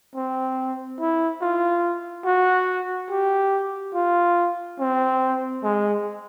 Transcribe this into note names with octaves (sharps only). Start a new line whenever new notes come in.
C4
E4
F4
F#4
G4
F4
C4
G#3